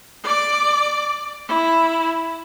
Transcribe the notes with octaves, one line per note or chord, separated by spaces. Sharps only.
D5 D6
E4